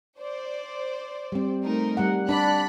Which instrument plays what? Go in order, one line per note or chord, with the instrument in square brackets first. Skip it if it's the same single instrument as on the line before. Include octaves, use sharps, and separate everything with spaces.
[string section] C5 D5
[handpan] G3 C4
[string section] A3 D#4 A#4
[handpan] G3 F#5
[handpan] D4 D5 [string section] B5 F#6